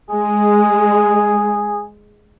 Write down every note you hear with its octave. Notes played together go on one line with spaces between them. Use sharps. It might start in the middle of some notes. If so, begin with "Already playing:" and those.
G#3 G#4